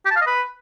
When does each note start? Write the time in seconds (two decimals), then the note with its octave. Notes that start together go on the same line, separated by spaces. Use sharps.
0.05 G4
0.11 A5
0.16 F5
0.21 D#5
0.26 B4